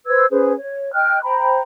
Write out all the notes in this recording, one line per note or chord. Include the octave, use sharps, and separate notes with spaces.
B4 C5 E6 G#6
C#4 G#4 B4 C5
C#5
D#5 G5 F6 F#6
C5 G5 A#5 B5